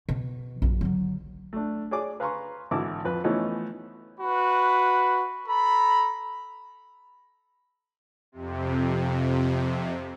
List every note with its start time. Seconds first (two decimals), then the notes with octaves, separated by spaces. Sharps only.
0.09 B2
0.62 A#1 F#2
0.81 D3 F#3
1.53 A3 D4
1.91 G#4 C#5 D5 D6
2.20 B4 F5 G#5 A#5 C6 C#6
2.71 G#1 D3 E3 E4 D6
3.05 F2 B4
3.24 E3 F3 A3 B3 C#4 D#4
4.19 F#4 B4 B5
5.48 A4 A#5 B5
8.32 F2 C3